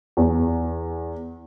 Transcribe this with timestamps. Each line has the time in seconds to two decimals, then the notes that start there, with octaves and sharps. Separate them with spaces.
0.17 E2